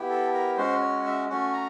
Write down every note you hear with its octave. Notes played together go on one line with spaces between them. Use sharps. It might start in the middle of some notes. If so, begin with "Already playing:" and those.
Already playing: B3 E4 G4
A4
A#4
G#3 C#4 F#4 C5
C#5
E5
A3 C#4 F#4
A#5